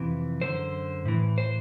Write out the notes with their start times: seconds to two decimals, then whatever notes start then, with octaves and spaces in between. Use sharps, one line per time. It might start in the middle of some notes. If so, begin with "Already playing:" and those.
Already playing: F2 C3 E3
0.41 F#2 D3 C5
1.05 A2 E3
1.38 C5